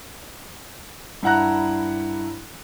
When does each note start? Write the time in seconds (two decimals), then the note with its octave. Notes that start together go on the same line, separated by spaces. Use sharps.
1.23 G2 E4 F#5 A#5 F#6